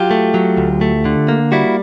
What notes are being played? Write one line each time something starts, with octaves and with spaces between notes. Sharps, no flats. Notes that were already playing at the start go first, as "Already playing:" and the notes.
Already playing: F#3 F4 G4
A3
F#3
D2
A3
D3
A#3
G3 E4 F#4